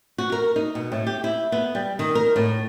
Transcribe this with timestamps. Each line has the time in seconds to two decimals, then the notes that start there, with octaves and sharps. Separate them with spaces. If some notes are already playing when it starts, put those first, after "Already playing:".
0.18 F#4
0.32 A#4
0.56 D#4
0.75 B2
0.92 A2
1.07 G4
1.24 E4
1.52 B3
1.75 G3
1.99 D#3
2.15 A#4
2.36 A2